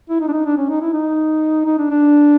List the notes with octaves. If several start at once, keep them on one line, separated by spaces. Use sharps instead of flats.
E4
D#4
D4
D#4
D4
C#4
D#4
E4
D#4
D#4
D4
D4